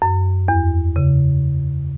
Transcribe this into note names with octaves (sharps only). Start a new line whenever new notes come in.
F#2
E2
C#3